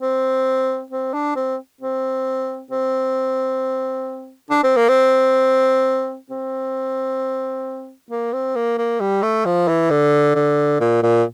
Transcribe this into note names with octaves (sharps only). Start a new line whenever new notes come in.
C4
C4
D4
C4
C4
C4
D4
C4
A#3
C4
C4
A#3
C4
A#3
A#3
G3
A3
F3
E3
D3
D3
A#2
A#2